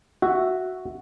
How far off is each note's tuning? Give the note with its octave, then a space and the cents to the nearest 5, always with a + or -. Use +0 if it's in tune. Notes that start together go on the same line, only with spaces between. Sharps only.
F#4 +0 E5 +0